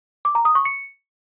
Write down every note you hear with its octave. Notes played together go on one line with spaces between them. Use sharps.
D6
A#5
D#6
C#6
C#7